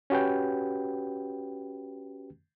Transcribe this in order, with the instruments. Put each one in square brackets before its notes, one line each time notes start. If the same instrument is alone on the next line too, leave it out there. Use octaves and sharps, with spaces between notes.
[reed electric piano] C#4 F#4 G4 B4 G5